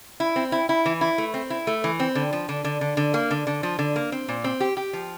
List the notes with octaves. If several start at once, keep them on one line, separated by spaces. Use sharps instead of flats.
E4
C4
E4
E4
E3
E4
A3
C4
E4
A3
E3
C4
D3
F3
D3
D3
D3
D3
A#3
D3
D3
F3
D3
A#3
C4
A#2
C4
G4
G4
F3